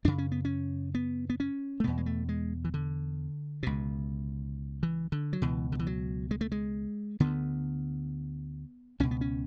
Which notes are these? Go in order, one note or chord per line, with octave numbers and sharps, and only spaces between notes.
F#2 C#3 D4
C#4
B3
C#4
B3
B3
C#4
A3
E2 B2 B3
G#3
A3
G#3
E3
D3
C#2 B2
E3
D3
F#3
C#2 B2 E3
D3
E3
F#3
G#3
A3
G#3
D2 D3 B3
C#2 B2 C#4
B3
C#4